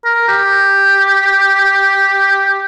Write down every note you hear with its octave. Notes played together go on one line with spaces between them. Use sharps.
A#4
G4